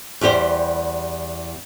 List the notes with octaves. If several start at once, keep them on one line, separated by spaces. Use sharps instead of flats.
E2 G3 G4 C5